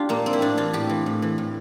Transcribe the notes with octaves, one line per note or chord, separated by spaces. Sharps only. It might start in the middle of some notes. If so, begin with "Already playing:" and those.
Already playing: D4 F4 G4
A#2 A#3
C4
E4
A2 D4
E3 F4
A2 G4
E3
A2
E3
A2